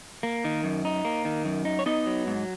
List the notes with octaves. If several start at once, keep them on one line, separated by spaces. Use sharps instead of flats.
A#3
D#3
F#2
D#4
A#3
D#3
F#2
D#4
C#5
B3 D#4 D#5
F#3
G#2